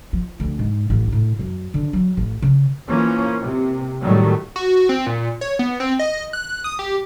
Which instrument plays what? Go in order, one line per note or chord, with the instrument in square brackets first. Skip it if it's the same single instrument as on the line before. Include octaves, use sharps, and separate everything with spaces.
[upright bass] F3
D2
G#2
A1
A2
F#2
D3
F#3
A1
C#3
[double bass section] E3 F3 A#3 C#4
C3
A2 D#3 F#3 G3 A3
[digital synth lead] F#4
C4
A#2
C#5
B3
C4
D#5
F#6
D#6
G4